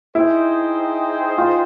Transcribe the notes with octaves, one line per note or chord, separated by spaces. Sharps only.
D#4 E4 G#4 C5 D#5 G5
F4